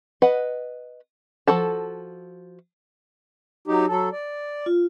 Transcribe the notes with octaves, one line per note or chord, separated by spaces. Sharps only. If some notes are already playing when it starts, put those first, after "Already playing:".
B4 D#5 F#5
F3 F#4 A4 A5
F#3 D#4 G4
F#3 A4
D5
F4